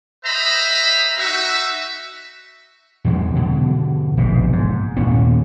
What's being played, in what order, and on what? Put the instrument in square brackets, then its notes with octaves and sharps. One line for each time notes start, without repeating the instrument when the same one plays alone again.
[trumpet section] B4 C5 D#5 E5 A#5 B5
D#4 F#4 E5
[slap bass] E2 B2 F#3 G#3
B2 D3
E1 A#1 G#2 C3
G#2
D#2 A#2 B3 C#4